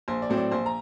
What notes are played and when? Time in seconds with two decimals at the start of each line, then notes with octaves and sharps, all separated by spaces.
0.08 A#1 C5
0.22 D5
0.30 A2 F#3 C4
0.37 D5
0.51 A#1 C5
0.66 A#5